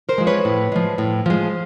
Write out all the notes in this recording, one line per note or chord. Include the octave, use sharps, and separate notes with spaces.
A#4 C5
F3 G#3
B4 C#5
A2
F3 G#3
A2
F3 G#3